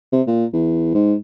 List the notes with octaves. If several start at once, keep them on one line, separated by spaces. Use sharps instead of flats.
C3
A#2
E2
G#2